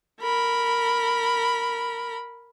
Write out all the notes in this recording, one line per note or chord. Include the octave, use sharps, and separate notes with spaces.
A#4 B5